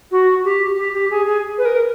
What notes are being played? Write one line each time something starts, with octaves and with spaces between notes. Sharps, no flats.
F#4
G4
G4
G4
G#4
G#4
B4
A#4